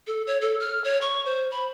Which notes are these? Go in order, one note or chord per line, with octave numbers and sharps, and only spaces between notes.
A4
C#5
A4
F6
C#5
C#6
C5
B5